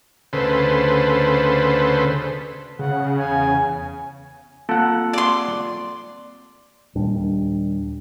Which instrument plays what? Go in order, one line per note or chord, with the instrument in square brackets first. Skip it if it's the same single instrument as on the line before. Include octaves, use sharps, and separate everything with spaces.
[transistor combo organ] D2 C#3 A4 B4 C5
[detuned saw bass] C#3 [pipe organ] F#5
[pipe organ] E2 G#5
[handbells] A#3 C4 F4 [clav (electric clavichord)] A4 F#5
[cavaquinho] D5 C6
[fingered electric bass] D#2 A#2 G3 D4